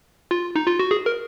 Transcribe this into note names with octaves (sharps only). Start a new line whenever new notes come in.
F4
D#4
F4
F#4
G#4
A#4